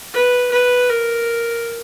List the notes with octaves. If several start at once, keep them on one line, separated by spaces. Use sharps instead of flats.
B4
B4
A#4